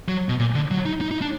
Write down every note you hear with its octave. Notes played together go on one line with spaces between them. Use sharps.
F#3
B2
A#2
D3
F#3
D#4
D#4
D#4
D4